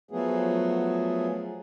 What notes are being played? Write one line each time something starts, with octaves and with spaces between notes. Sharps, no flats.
F3 F#3 A3 B3 G#4